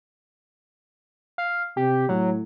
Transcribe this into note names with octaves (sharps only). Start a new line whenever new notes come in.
F5
C3 G4
A2 F#3